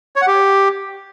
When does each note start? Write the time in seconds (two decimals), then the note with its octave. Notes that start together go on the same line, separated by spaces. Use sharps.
0.16 C#5
0.21 F#5
0.27 G4